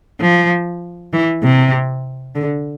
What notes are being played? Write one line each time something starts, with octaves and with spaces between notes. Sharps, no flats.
F3
E3
C3
D3